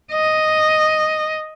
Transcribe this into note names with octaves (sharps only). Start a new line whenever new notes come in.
D#5